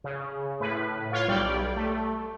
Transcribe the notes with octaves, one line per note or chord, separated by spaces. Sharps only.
C#3
A2 B4
F4 C#5 F5
B1 G3 D5 G5
A3